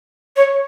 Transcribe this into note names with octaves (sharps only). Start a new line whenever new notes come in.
C#5